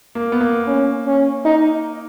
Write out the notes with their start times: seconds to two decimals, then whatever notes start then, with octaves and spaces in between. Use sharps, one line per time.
0.15 A#3
0.32 B3
0.41 A#3
0.67 C#4
1.06 C#4
1.45 D#4